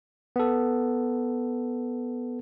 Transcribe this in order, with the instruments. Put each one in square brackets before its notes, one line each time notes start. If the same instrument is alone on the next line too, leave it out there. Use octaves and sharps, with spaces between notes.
[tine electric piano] B3 A4